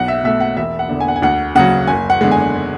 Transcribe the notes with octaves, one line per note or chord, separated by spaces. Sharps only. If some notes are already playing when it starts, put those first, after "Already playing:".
Already playing: B1 F#5
E5
B2 A3 E5
F#5
E1 E5
F#5
E2 D3
G#5
F#5
G#5
D2 F#5
C#3 F#3 F#5
F#1 G#5
F#5
E2 D3 G#3
G#5